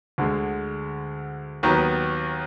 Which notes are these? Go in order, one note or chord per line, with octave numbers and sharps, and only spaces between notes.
D2 D3 G#3
D#2 D#3 F#3 B3